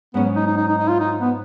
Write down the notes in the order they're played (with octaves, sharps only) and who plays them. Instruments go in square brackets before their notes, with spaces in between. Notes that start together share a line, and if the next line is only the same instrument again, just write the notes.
[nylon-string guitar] G#2 F#3 C#4 [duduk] B3
[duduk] D#4
D#4
D#4
D#4
D#4
F4
D#4
B3